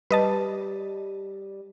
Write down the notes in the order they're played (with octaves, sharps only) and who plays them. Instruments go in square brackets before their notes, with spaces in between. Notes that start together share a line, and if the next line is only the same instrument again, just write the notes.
[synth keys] G3 [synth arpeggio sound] B4 D#5 A5